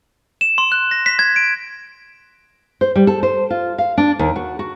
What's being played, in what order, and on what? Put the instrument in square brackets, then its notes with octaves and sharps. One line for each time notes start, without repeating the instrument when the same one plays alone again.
[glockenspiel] E7
C6
F#6
A#6
B6
G#6
D7
[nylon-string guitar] C5
G3
A4
C5
F4
F5
D4
D#2
F#4
F#4